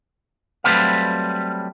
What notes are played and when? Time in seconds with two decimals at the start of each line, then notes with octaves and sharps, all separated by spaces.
0.64 F#3 G3 A3 C4 B4 F5